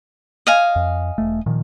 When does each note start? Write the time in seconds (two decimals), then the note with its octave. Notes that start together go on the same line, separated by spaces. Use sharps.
0.47 D#5 F5 G#5
0.76 F2
1.18 E1 A3
1.46 A#2 D#3 F3